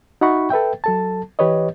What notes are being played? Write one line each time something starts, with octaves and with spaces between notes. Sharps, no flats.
D#4 F#4 E5 F#5 B5 C#6
A4 B4 E5 G5
F#3 A4 A5
E3 G4 B4 C#5 D#5